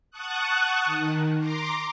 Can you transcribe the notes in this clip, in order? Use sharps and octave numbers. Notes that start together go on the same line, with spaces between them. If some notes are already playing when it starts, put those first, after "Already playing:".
F#5 A5 C#6 D#6 F#6
D#3
A#5 C6 D6